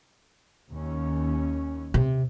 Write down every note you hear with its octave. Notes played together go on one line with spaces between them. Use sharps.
D#2 C#4
C3